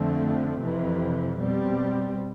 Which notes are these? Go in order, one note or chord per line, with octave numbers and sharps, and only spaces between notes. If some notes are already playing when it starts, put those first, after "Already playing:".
Already playing: F2 D3 F3 A3 C4
F2 C3 E3
B2 G3 C4